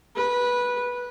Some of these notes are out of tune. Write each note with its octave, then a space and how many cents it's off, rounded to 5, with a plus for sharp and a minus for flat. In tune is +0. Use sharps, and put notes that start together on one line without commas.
B4 -15